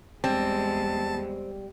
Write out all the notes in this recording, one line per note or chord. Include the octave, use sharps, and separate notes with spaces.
E2 G3 G#3 C4 A5